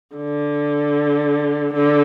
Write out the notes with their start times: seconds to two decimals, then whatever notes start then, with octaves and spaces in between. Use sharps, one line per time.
0.16 D3
1.74 D3